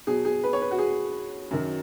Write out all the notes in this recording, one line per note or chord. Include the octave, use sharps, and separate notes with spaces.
B2 F#3 G#4
G#4
B4
C#5
B4
F#4
G#4
F#2 D#3 F#3